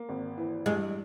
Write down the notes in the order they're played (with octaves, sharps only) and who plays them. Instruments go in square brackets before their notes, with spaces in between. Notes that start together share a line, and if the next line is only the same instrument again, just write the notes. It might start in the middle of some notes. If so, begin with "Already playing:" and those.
Already playing: [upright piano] A#3
G#1
E3
[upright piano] G2 [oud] G#3